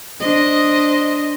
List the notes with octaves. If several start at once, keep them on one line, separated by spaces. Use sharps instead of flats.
D4 C5 D#5